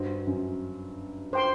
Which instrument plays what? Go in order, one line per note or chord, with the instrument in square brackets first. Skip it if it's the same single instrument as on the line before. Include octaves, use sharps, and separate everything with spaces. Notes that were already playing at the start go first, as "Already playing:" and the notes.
Already playing: [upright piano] G2 [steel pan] F#4 C5 D#5
[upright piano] F#2
[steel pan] C5 G5 C6